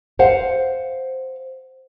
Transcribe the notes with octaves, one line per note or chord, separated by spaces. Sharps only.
C5 F5 F#5